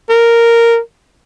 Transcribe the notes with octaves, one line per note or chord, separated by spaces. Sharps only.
A#4